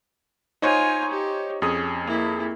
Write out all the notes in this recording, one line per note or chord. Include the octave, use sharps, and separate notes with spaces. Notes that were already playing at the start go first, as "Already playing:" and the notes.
D#4 F4 C5 C#5 G#5
G4
F2 C#4 G#4 D#6
A#3 E4